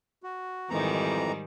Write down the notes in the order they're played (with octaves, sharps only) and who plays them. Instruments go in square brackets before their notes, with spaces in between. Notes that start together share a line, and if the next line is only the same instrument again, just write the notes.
[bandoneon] F#4
[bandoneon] F2 E3 A#5 [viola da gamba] G#2 D#3 G3